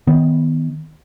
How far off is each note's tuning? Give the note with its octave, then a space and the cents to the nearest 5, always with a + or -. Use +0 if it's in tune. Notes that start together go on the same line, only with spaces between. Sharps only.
D#3 +15 B3 +0